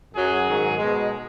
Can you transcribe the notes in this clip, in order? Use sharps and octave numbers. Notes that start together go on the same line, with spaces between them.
F#2 F#3 G#4
G#2 D#3 F#3
B2 G#3